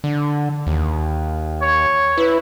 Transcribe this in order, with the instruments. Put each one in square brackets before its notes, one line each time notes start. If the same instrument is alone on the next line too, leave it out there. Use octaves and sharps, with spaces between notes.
[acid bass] D3
D#2
[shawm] C#5
[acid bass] E4 [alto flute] B4